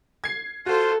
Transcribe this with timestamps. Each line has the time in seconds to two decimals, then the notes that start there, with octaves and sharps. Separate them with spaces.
0.24 G#6 C7
0.66 F4 F#4 A4 C5